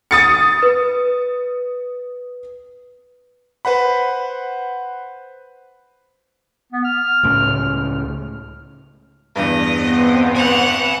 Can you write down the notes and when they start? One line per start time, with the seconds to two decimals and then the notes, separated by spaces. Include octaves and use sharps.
0.11 D#6 A6 C#7
0.62 B4
3.65 B4 C5 F#5 B5
6.72 B3
6.84 F6
7.23 C#2 A2 C#3
9.36 E2 G2 D#5
9.77 B3 C4
10.35 F#5 G#5 B5